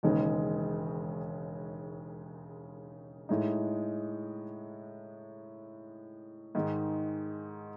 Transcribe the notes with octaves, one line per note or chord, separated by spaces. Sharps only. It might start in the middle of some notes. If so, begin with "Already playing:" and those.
E1 D#2 C#3 G#3 D#4
A2 G#3 D#4
G#2 D#3 G#3